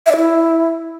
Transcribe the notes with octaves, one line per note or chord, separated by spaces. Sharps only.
E5
D5
E4